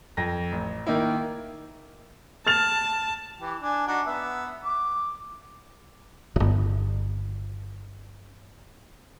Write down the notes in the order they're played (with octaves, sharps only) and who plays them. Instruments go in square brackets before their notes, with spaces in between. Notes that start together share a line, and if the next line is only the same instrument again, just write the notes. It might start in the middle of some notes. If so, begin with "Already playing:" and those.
[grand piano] F2 A#6
A1
D#3 A#3 D#4 E4
[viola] A5 [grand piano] F6 A6 F7
[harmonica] E3 G4
D4 G#5
D4 D#4 F#4
B3 E5
D6
[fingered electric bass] D1 G1